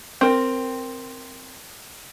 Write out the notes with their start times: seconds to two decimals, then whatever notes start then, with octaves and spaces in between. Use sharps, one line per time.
0.21 C4 A#4